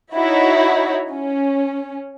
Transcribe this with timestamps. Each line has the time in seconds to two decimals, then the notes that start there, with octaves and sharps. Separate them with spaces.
0.16 D#4 E4 F#4 C#5
1.12 C#4